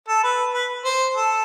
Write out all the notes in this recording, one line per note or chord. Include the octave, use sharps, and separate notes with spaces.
A4
B4
B4
C5
A4